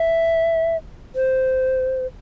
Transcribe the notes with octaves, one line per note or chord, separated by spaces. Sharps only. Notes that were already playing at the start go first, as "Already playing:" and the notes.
Already playing: E5
C5